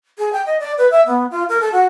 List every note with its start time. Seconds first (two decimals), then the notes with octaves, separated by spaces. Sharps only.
0.18 G#4
0.33 G5
0.46 D#5
0.60 D5
0.78 B4
0.91 E5
1.06 B3
1.31 F4
1.49 A#4
1.61 A4
1.73 F#4